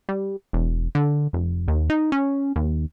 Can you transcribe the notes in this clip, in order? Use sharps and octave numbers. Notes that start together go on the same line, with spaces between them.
G3
E1
D3
F1
D#2
D#4
C#4
D#2